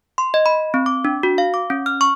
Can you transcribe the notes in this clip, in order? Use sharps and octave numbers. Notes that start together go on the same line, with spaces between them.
C6
D#5
B5
C4
D6
D4
F#4
F5
D6
C#4
F6
C#6